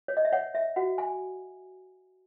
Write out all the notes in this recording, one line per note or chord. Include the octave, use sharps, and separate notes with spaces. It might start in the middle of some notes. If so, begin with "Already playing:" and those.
C#5
D#5
E5
C#5 F#5
E5
F#4 F#5
G#5